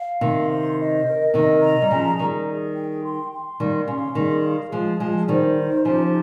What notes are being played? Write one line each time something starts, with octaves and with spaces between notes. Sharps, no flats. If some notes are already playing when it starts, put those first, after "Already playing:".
Already playing: F5
C3 D#3 C6
C5
D#5
A#4
C3 D#3 D#5
A#5
G3
C#3 F3 G#4
D#3 G3 G#4
G#4
G5
C6
C6
D#3 G3 F5
C#3 C6
D#3 G3 G#4
F5
F3 G#3 G#4
F3 G#3 G#4
D#3 G3 C5
D#4
C#3 F3 G4